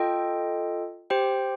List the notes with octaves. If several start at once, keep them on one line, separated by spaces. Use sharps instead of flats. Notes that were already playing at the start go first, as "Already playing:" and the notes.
Already playing: F4 A4 D#5 G5
G4 C5 G5